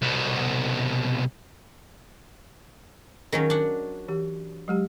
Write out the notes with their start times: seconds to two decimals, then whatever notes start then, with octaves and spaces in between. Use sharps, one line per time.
0.02 C2 B2
3.32 D#3 F#3 C#4 G#4
3.50 D4 F#5
4.08 E3 G4
4.68 F#3 G#3 G4